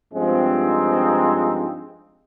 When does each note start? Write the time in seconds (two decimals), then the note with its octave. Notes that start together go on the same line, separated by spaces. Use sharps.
0.13 G2 F3 G#3 C4
0.61 D#4